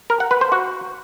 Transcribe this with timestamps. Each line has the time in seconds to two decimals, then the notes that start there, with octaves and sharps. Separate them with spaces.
0.10 A#4
0.20 F#5
0.31 B4
0.41 C5
0.52 F#4